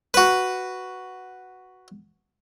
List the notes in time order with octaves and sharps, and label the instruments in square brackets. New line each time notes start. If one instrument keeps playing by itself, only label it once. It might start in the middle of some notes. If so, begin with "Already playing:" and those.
[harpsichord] F#4 B4